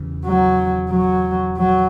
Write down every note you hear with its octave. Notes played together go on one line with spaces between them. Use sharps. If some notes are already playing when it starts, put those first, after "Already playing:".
Already playing: E2 C#3 E3
F#3
F#3
F#3